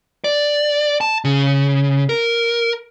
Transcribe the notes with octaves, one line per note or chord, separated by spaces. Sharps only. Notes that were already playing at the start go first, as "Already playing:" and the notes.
D5
A5
C#3
A#4